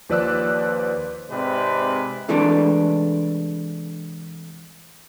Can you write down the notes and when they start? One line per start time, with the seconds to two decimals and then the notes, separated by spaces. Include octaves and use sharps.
0.09 D#2 F3 B4 D5 E6 F#6
1.30 G#2 C3 G#3 C4 B4 D5
2.29 C3 E3 G#3 A3 D4